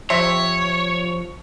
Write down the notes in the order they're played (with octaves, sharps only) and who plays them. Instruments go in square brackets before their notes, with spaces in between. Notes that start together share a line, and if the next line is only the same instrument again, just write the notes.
[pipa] C3 C5 E5 [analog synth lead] F3 [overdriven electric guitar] C#5